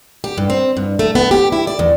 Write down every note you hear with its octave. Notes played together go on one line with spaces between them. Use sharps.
G4
G2
C4
G2
A3
B3
G4
E4
D5
E2